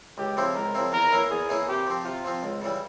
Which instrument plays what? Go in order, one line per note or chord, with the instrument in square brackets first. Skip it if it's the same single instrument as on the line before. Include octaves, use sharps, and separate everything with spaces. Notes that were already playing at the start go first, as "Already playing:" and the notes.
[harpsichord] C#2 [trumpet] G4
[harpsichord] C#3 F3 C4 E4
[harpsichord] C#2 [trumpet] A#4
[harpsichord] C#3 F3 C4 E4
[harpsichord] E2 [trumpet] A#4
[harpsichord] E3 A#3 C#4 E4
[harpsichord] E2 [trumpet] G#4
[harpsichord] E3 A#3 C#4 E4
[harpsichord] C3 [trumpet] G4
[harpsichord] F3 C4
[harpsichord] C3 [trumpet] F4
[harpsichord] F3 C4
C#2
C#3 E3 G3